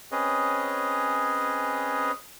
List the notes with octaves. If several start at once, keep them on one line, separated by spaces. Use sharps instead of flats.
C4 C#4 G#4 B4 C#5 D#5